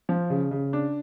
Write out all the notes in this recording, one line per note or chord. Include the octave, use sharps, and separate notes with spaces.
F3
C#3
C#3
D4